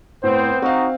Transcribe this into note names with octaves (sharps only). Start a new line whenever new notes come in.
A2 B3 C4 C5
C4 D#4 F#4 F5